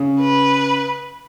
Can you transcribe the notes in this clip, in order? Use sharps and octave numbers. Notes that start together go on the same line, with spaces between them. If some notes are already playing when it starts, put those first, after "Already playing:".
Already playing: C#3
B4